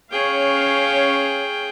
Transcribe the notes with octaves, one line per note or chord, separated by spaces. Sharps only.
C#4 G#4 C#5 F5 G5